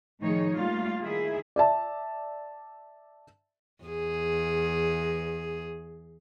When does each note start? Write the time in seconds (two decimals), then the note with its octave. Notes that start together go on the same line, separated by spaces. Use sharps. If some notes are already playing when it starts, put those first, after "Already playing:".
0.20 A2 D#3 F3 D#4 G#4 C#5
0.54 G3 A3 A#3 F4
1.01 D#3 E4 G#4 E5
1.56 D5 E5 A5
3.84 E2 G#4